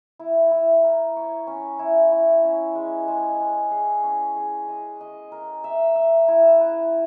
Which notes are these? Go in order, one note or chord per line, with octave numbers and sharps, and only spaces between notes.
E4
E4
A#4
C#5
C#4
E4
E4
C#4
G#3
G#3
G#3
G#4
C#4
G#4
D#5
D#5
A#4
E5
E5
E4
B4